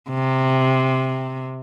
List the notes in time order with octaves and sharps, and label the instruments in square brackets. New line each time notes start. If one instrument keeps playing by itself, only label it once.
[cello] C3